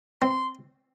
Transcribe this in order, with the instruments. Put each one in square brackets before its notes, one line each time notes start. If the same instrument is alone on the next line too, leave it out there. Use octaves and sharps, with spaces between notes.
[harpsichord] C4 [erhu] C6